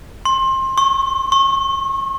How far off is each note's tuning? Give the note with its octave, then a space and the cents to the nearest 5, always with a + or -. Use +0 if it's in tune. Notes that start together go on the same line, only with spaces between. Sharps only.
C6 +25
C#6 -35
C#6 -35